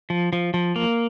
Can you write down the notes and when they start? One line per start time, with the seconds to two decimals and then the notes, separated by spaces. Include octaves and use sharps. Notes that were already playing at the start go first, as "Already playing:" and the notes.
0.10 F3
0.33 F3
0.54 F3
0.76 A#3